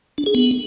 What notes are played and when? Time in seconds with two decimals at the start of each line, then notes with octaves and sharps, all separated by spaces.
0.18 D4
0.26 G#4
0.35 B3